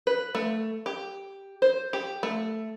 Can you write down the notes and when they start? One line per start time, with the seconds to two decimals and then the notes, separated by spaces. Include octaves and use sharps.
0.07 B4
0.35 A3
0.86 G4
1.62 C5
1.93 G4
2.23 A3